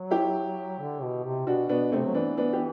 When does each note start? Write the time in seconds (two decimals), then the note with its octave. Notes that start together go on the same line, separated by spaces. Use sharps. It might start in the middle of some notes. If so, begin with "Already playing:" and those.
Already playing: F#3
0.11 E4 G4
0.79 D3
1.02 B2
1.25 C3
1.47 B2 D4 F#4
1.69 B2 B3 D4
1.92 C3 A3 C4
2.05 F#3
2.14 E3 B3 D4
2.37 B3 D4
2.53 G4